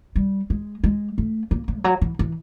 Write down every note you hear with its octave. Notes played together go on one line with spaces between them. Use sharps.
G3
G#3
G#3
A3
A#3
B3
F3
F#3
E3
E3